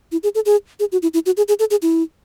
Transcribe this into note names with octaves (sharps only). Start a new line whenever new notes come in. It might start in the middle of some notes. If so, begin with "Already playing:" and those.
E4
G#4
A4
G#4
G#4
F#4
E4
E4
F#4
G#4
G#4
A4
G#4
E4